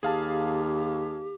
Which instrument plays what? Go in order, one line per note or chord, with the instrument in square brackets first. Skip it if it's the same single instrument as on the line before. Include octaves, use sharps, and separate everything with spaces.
[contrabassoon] D#2 [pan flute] G4 [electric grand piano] G#4 F5 A5